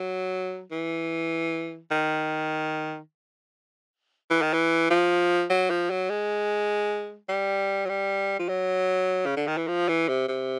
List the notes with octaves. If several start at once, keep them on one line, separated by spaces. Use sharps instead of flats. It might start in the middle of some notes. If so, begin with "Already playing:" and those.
Already playing: F#3
E3
D#3
E3
D#3
E3
F3
F#3
F3
F#3
G#3
G3
F#3
G3
F3
F#3
C#3
D3
D#3
E3
F3
E3
C3
C3